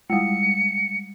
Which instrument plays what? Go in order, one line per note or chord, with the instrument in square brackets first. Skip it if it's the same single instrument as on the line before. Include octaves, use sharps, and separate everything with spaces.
[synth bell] G3 G#3 [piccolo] C#7